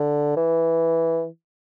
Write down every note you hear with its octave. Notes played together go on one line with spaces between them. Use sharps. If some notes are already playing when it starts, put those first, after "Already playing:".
Already playing: D3
E3